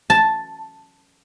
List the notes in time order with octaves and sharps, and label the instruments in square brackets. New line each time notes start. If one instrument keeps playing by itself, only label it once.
[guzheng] A5